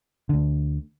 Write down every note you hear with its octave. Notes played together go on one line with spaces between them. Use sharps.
D2 D3